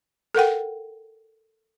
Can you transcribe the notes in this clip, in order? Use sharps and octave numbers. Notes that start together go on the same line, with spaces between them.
A4 A#4 F#5 G5